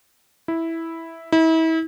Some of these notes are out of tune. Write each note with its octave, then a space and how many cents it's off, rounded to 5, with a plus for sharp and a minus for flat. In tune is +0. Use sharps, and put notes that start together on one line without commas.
E4 -5
E4 -35